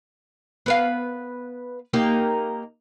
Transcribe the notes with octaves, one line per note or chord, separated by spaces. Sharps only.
B3 B4 F5
A#3 D#4 G4